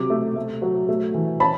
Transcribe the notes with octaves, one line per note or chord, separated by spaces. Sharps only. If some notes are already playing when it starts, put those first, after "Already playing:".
Already playing: C3 F#3 D6
A3
A3
F#3
A3
E3
C#4 A5 B5